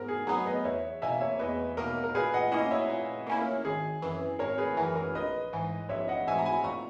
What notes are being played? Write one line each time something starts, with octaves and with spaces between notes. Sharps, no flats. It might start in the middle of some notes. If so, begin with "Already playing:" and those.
Already playing: G#2 B3 A#4
G#4
F#3 B3 D#4 G#4 B4
B4 D#5
E2 C#5 E5
B2 A#3 E5 G#5
C#5 E5
E2 B4 D#5
B2 A#3 A#4
A#4
A#2 G#4 B4
D#5 F#5
A#3 C#4 E4 D#5 F#5
C#5 E5
A#2
A#3 C#4 E4
A#4
G#1 G#4
F#2 E3
G#1 A#4 C#5
G#4 B4
F#2 E3 A#4
A#4
A#1 B4 D#5
G#2 E3
A#1 C#5 E5
D#5 F#5
G#2 E3 E5 G#5
A#5
G#5 B5
A#2 A#5 C#6